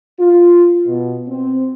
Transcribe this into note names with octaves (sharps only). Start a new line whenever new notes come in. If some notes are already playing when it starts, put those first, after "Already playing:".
F4
B2
C4